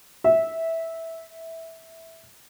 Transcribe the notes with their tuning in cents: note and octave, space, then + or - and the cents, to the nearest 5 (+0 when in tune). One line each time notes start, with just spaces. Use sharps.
E5 -10